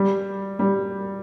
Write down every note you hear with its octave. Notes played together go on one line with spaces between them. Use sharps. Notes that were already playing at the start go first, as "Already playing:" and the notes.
Already playing: G3
G3